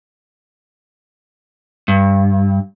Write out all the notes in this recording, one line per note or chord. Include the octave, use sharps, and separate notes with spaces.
G2